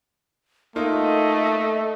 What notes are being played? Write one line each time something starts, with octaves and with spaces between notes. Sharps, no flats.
A3 A#3 D#4 F4 D#5